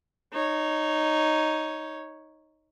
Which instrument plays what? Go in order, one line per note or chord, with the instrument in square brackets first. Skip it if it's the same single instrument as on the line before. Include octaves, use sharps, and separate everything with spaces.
[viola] D#4 C#5